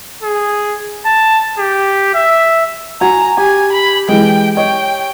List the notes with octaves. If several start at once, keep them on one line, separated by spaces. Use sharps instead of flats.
G#4
A5
G4
E5
F#4 G#5 A#5
G4 G#5
B5
E3 G#3 G5
C#5 D#5 G5